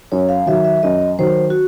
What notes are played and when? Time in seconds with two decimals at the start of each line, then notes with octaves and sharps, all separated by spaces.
0.12 F#2 C#5
0.29 F5
0.46 D#3 F#3 E5
0.64 E5
0.83 F#2 D#5
1.19 D#3 F#3 C5
1.50 F#4